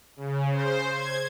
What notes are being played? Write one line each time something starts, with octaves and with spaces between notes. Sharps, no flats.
C#3
C5
G#6